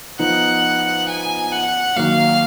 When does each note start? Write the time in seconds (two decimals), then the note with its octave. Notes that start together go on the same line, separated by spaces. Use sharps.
0.19 F3 B3 D#4 F#5
1.08 G#5
1.51 F#5
1.96 D#3 F#3 A#3 F5